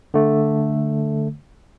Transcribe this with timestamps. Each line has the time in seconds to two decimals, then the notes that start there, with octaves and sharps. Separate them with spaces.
0.14 D3 A3